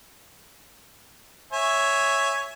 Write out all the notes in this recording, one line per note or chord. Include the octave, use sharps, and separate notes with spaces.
C#5 E5 G#5